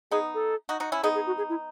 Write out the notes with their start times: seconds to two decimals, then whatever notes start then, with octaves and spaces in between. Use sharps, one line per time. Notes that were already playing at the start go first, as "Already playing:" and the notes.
0.11 B3 D#4 G#4
0.35 A4
0.69 D#4 F#4
0.80 D#4 F#4
0.92 C#4 E4
1.03 B3 D#4 G#4
1.15 G#4
1.27 F#4
1.38 G#4
1.49 E4